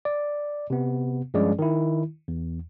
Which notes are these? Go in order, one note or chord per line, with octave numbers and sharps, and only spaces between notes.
D5
C3 B3
G2 F3 G#3 C#4 G#4 D5
D#3 E4
E2